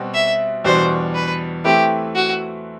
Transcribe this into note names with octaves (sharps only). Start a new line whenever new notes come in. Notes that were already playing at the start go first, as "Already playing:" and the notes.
Already playing: B2 G3 C4 F#4
E5
E2 B2 G3 D4 F#4 C5
B4
E3 A3 C4 E4 G4 B4
F#4